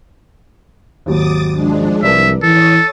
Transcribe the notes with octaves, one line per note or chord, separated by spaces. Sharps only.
G#1 D#2 F#3 D6 D#6 A6
F3 G#3 D4
C2 A#4 B4 D5 E5
E3 A4 C#5 D#6 A6